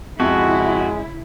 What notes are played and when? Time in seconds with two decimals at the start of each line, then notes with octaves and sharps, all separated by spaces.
0.20 F2 C#3 G#3 E4 F#4